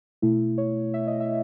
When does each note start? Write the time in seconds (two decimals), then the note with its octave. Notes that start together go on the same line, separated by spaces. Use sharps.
0.22 B2 A3 E4
0.58 C#5
0.94 E5
1.07 D#5
1.20 E5